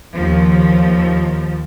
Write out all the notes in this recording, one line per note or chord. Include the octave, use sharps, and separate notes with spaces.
D#2 F3